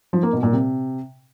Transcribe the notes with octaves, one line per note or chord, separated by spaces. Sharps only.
F3
A#3
B2
A#2
C3